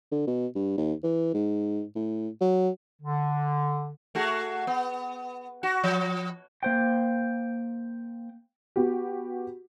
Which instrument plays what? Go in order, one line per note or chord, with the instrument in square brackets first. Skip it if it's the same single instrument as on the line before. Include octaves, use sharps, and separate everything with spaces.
[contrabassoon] D3
B2
G2
D#2
E3
G#2
A2
F#3
[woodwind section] D3
[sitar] A3 F#4 G#4
B3
F#4
F3
[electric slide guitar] A#3 C5 G5
[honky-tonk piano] B3 F#4 G4